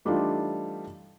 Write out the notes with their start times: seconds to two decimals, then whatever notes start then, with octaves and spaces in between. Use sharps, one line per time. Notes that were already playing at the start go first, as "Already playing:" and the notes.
0.05 E3 G3 A3 D4 D#4 F4